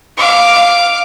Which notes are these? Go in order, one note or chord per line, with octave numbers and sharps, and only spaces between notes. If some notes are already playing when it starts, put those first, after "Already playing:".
F5 D6